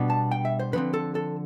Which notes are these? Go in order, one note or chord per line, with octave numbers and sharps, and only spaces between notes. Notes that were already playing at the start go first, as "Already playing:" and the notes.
Already playing: B2 G3 B3 D4
A5
G5
E5
C5
D3 F3 C4 B4
A4
A4